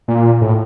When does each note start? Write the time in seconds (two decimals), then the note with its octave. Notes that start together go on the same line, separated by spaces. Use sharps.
0.08 A#2
0.41 A2